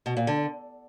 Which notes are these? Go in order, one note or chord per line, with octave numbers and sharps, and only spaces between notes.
B2
A#2
D3